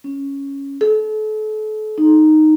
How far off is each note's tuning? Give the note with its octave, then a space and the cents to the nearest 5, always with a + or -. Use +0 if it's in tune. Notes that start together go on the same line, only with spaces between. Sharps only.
C#4 +0
A4 -35
D#4 -5